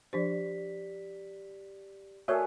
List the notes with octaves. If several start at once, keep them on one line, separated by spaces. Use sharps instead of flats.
F3 D4 G4 C5 D5 B6
A3 F#4 G#4 A#4 C#5 D5 E5 F#6